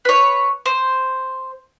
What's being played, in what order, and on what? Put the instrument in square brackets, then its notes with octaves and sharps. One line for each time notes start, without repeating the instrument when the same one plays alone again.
[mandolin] B4 C#5
C5